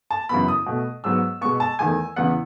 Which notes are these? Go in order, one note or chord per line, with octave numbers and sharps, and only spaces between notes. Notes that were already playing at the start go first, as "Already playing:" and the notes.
A5
F#2 C#3 E3 B3 B5
D#6
B2 A3
G#2 F#3 B3 E6
B2 G#3 B3 C#6
A5
E2 D#3 A3 G#5
E2 C#3 E3 B3 F#5